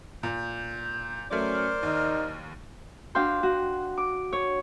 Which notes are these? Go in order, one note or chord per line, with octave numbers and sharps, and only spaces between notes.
A#2 G6
F#3 A3 C#4 A#4 C5 D5 F6
D#2 D#4
D4 F#4 F5 G5 C6
F#4
D6
C#5